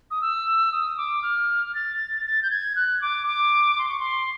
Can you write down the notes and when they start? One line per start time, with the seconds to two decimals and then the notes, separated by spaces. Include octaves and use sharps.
0.11 D#6
0.22 E6
0.72 D#6
0.98 D6
1.23 F6
1.75 A6
2.25 A6
2.43 G6
2.51 G#6
2.76 F#6
3.02 D6
3.27 D6
3.78 C6
3.89 C#6
4.00 C6